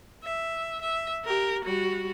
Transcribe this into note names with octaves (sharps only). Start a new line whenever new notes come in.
E5
E5
G4 A#4
G3 F#4